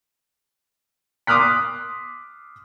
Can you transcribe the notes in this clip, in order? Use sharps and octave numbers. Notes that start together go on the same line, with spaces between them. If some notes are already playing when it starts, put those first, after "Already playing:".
C6 D6 D#6 F6 F#6 B6